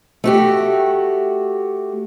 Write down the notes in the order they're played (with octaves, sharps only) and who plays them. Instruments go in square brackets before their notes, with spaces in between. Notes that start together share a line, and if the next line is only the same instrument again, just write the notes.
[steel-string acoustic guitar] A3 F#4 G4